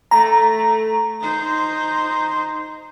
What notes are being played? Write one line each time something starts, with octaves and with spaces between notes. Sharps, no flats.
A3 A#5
D#4 C5